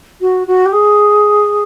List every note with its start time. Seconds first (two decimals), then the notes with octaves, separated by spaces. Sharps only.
0.21 F#4
0.47 F#4
0.66 G4
0.73 G#4